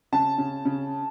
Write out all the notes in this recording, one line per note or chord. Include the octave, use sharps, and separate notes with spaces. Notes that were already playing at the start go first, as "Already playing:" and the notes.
C#3 A5
C#3
C#3